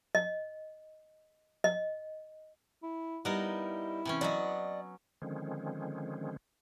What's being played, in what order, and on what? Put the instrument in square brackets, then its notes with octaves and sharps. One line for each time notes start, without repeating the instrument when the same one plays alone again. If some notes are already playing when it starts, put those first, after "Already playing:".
[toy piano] D#5
D#5
[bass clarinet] E4
[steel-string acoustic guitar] G3 D#4 [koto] B3 A#4 [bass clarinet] E4
[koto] C3 E3 C#4
[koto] F#3 B3 [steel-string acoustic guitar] D5 D#5
[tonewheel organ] D3 D#3 F3 G#3 C4 C#4